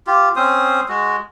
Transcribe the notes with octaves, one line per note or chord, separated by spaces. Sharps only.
F4 G4
C4 C#4 C5 D#6
G#3 F#4